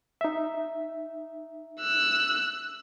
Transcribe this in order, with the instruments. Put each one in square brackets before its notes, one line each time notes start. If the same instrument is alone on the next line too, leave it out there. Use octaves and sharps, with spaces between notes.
[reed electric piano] D#4 E5
[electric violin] E6 F#6